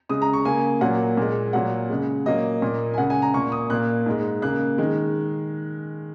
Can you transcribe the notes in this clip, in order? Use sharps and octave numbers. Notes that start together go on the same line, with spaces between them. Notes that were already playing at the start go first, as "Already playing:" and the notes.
C#3 G#3 D#6
A#5
C#6
C#3 A#3 G#5
A#2 F#3 A#3 F#5
A#2 G#3
A#2 F#3 A#3 F#5
C#3 G#3
A#2 F#3 A#3 D#5
A#2 A#3
G#5
C#3 G#3 F#5
G#5
A#5
A#2 A#3 C#6
D#6
A#2 A#3 F#6
G#2 G#3
C#3 A#3 F#6
D#3 G#3